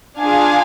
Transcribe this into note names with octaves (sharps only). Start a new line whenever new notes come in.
D4 F4 G#4 F5 G#5